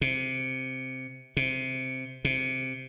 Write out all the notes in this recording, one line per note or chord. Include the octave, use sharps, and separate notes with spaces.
C3
C3
C3